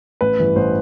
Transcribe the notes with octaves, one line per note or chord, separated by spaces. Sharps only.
A1 B4
G2 E3
A1 C5